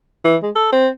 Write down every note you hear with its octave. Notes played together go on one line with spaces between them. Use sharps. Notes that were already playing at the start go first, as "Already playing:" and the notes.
E3
G#3
A4
C4